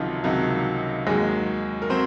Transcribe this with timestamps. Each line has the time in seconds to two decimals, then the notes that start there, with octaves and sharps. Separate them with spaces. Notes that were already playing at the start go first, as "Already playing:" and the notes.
Already playing: C#2 C3 D#3 F3 F#3 F4
0.24 C#2 C3 D#3 F#3
1.06 D#2 D#3 F#3 G#3 G#4
1.82 A#4
1.90 F#3 C4 C5